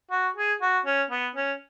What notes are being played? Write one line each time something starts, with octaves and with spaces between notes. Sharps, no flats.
F#4
G#4
F#4
C#4
B3
C#4